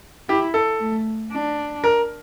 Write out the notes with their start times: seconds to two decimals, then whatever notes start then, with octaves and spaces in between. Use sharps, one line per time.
0.29 E4 G4
0.54 A4
0.80 A3
1.32 D4
1.84 A#4